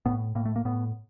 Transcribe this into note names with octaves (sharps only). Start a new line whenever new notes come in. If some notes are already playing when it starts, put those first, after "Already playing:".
A2 B3
A2 A#3
A3
A#3
A2 B3